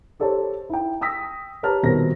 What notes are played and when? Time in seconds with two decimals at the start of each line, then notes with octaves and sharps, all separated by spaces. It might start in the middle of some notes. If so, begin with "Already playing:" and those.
0.20 G4 A4 C5 C#5 A5
0.70 E4 G5
1.01 G5 D#6 E6 A#6 B6
1.63 G4 B4 C#5 A5 A#5 F6
1.83 D#1 B2 C4 A#4 A#6